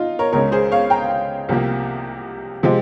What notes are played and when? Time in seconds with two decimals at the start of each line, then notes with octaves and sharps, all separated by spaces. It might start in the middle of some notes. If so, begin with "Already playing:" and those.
Already playing: D#4 F4
0.19 A#4 C#5
0.33 C#2 C#3 G#3 C#4 A#4 C#5
0.52 G#4 C5
0.72 C#5 F5
0.90 G5 A#5
1.49 C2 C3 F3 A#3
2.63 C3 F3 G#3 C4